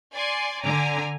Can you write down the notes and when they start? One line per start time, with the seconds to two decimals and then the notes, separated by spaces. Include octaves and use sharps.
0.14 D5 G#5 C6
0.63 D3 G#5 A#5 D6